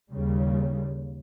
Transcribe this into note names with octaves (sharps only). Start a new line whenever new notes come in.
D#2 C#3 G3